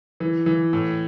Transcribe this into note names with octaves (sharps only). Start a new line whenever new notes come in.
E3
E3
A2